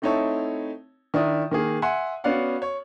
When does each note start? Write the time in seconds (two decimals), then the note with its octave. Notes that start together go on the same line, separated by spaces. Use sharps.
0.02 A3 C4 D#4 E4 C#5 A5
1.14 D#3 D4 E4 D#6
1.51 D#3 A#3 G#4
1.82 E5 F#5 G#5 C6
2.24 B3 C#4 F#4 D5 F5 F#5
2.62 C#5